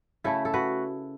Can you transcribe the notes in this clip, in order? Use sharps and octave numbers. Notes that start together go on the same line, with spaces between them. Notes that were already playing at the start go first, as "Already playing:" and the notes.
C#3 A3 E4 A4
A4
F#4 B4